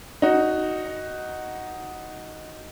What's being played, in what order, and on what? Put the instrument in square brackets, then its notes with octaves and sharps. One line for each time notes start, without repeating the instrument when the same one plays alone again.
[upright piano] D#4 F#4